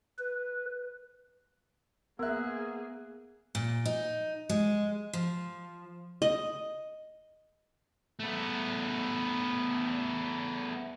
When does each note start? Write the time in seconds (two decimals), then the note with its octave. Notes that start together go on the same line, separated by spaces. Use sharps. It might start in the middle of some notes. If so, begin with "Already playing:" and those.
0.19 B4
2.19 A#3 B3 G#4 A#4 E5 F#6
3.55 A#2
3.85 D#4
4.49 G#3
5.13 F3
6.22 D#5
8.20 A3 B3